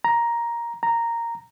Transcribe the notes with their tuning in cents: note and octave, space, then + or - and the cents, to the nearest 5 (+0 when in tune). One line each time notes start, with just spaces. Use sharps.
A#5 +10
A#5 -5